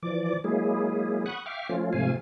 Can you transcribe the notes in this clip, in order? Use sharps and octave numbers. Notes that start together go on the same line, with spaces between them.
E3 F3 D5 D6
F#3 G#3 A#3 E4 G#4
F#5 B5 C#6 D#6 F#6
E5 F5 G5 C#6 D6 F6
F3 A3 C#4 F4
G#2 C3 F3 A3 F5 G#5